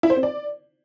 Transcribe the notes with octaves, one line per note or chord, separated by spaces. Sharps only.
E4
C5
C4
D5